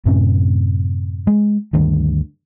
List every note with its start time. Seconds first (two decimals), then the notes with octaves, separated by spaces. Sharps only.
0.06 F#2 A2 C3 C#4
1.27 G#3
1.73 D2 G2 D#3